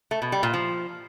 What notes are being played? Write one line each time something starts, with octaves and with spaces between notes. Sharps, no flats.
A3
B2
G3
A#2
F3